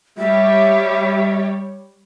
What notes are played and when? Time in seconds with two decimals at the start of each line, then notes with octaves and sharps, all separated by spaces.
0.18 G3 G4 C#5 E5